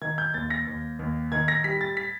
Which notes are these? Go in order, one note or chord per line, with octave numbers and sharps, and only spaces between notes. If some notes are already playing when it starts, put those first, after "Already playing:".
D#3 G#6
G6
D#2 A6
A#6
D#2
D#2
D#3 G#6
A#6
G3 B6
A6
B6